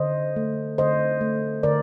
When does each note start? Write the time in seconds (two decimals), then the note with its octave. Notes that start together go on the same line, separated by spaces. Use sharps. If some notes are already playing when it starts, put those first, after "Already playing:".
Already playing: D3 C5 D#5
0.36 A3
0.78 D3 C5 D#5
1.21 A3
1.63 D3 A#4 D5